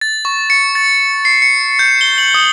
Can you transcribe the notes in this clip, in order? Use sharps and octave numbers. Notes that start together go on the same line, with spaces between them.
A6
C#6
C#7
A6
C7
C#7
G6
G7
F#7
D#6